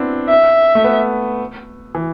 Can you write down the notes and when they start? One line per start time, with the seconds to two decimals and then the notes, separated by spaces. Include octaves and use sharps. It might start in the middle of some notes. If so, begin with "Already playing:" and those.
Already playing: B3 C4 D4 E4
0.29 E5
0.75 A3
0.84 B3
1.95 E3